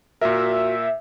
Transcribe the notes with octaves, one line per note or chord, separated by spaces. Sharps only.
A#2 F#4 A#4 E5